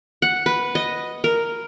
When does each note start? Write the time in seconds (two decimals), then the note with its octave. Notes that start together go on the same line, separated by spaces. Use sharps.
0.22 F#5
0.46 B4
0.75 D#5
1.24 A#4